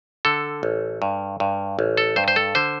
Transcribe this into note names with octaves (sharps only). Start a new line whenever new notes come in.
D3 A4
A1
G2
G2
A1
A4
G2 C5
C5
A4
D3 C5